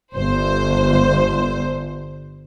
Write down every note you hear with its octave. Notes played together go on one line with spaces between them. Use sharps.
G1 C5